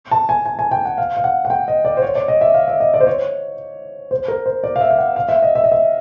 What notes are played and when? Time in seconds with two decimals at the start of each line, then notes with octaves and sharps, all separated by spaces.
0.11 A5
0.29 G#5
0.46 G#5
0.59 G#5
0.71 G5
0.85 F#5
0.98 F5
1.17 F5
1.24 F#5
1.45 F#5
1.50 G5
1.68 D#5
1.85 D5
1.97 C5
2.02 C#5
2.15 D5
2.28 D#5
2.41 E5
2.54 F5
2.68 E5
2.80 D#5
2.94 D5
3.00 C5
3.07 C#5
4.11 C5
4.28 A#4
4.46 C5
4.64 D5
4.76 F5
4.81 E5
4.91 F5
4.98 F#5
5.16 F5
5.29 E5
5.42 D#5
5.55 E5
5.64 D#5
5.72 E5